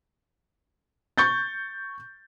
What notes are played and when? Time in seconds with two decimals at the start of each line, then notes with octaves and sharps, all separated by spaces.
1.18 C#6 G6 A6